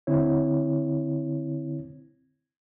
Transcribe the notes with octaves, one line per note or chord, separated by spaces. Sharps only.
D3 C4 E4 C#5